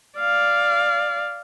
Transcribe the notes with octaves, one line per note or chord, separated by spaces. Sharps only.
D5 F5